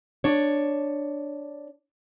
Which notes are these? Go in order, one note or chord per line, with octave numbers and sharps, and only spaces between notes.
D4 C#5